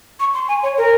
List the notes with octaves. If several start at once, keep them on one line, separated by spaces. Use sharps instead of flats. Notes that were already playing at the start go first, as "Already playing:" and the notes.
C#6
C6
G#5
C#5
A#4